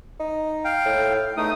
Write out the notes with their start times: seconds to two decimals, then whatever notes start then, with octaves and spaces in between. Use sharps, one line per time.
0.20 D#4
0.65 F5 G5
0.86 A2
1.37 E2 A3 D#4 D#6